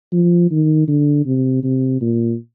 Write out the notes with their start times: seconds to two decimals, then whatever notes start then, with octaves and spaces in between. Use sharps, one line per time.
0.12 F3
0.51 D#3
0.88 D3
1.26 C3
1.63 C3
2.01 A#2